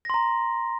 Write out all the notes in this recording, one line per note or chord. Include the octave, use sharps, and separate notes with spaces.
A#5 C6 A#6